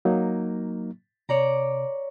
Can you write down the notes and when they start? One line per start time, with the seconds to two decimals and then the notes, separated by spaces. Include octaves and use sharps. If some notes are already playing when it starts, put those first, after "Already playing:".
0.05 F#3 A#3 D#4
1.29 C3 C#5 D5 A#5